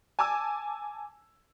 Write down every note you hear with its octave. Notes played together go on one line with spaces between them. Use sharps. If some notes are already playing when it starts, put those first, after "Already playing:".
G#5 A5 D6 E6